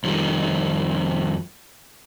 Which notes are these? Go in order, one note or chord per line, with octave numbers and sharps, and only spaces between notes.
F2 D#3 G3